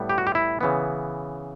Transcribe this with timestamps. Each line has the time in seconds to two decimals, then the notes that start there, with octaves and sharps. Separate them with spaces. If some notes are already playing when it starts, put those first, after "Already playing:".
Already playing: A2 G3 B3
0.09 G4
0.18 F#4
0.27 G4
0.35 E4
0.61 C#3 E3 B3